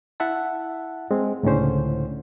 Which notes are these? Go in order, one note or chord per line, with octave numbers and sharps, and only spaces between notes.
E4 E5 F#5 A5
G#3 C4
C#2 A2 D3 C#4 C5